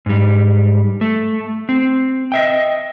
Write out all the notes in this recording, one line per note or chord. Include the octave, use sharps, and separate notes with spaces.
G#2 G3
A3
C4
D#5 E5 G5